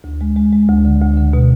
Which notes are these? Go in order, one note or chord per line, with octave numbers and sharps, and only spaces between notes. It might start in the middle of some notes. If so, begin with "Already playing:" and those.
D2
G#3
G#3
G#3
D2
D3
D2
D3
B2